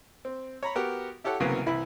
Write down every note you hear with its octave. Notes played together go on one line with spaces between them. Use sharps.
C4
C#5 A#5 B5
B3 F#4 G4 A#4
E4 G4 A4 C#5 F#5
C2 C#3 E3 F#3 A#3 B3
C2 E3 E4 B5